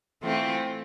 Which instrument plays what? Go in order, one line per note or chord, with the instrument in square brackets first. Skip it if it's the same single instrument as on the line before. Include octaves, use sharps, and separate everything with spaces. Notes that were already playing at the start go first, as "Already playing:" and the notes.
[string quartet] E3 A3 C4 F4